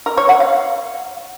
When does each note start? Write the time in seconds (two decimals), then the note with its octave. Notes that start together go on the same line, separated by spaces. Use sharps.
0.06 A#4
0.17 C#5
0.29 F#5
0.40 F5